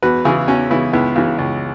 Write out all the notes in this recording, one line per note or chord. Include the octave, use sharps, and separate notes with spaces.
E2 F#4 B4
C#3 E3 E4 G#4
E2 C#4 F#4
C#3 E3 B3 E4
C#2 B3 E4
C#3 E3
C#2